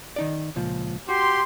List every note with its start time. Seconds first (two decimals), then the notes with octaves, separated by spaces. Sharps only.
0.16 D#3 D#4 D5
0.56 C#2 A#2 F3
1.09 F#4 G4 C6